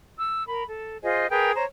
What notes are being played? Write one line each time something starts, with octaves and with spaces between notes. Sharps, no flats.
E6
A#4 B5
A4
F4 G#4 C5 D#5
G#4 A#4 B4 G5
C5 C#5 A#5